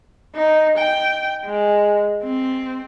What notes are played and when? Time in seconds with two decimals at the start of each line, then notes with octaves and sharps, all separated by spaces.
0.35 D#4
0.78 G5
1.45 G#3
2.23 C4